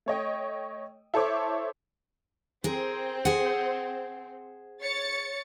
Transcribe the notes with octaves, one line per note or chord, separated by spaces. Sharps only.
A3 C#5 D#5 G5
E4 A4 C5 C#5 D6
C4 G#4 A#4
G#4 C5 F#5
C#5 A6 C#7